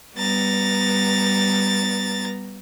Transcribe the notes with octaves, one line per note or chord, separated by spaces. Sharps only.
G3 B3 A#5 A6